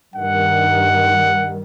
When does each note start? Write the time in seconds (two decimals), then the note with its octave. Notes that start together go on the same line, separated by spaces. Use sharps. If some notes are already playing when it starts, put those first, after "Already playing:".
0.16 G2 D#3 G3 F#5